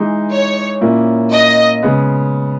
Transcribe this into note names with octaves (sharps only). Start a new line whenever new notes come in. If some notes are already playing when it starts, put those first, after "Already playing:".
Already playing: E3 G#3 D#4
C#5
A#2 A#3 C#4 E4
D#5
C#3 G#3 B3